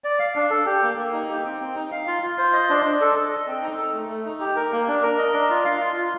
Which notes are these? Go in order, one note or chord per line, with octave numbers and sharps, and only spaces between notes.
D5
F5
D4
A4
G4
A#3
A#3
D#4
G4
C4
C4
D#4
F5
F4
F4
C5
D#5
D4
D4
A4
A4
D#5
C4
D#4
A4
A3
A3
D#4
G4
A#4
A#3
D4
A#4
D#5
D4
F4
F5
F4
F4